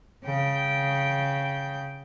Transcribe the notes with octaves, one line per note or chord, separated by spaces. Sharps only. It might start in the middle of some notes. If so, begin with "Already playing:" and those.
C#3 G5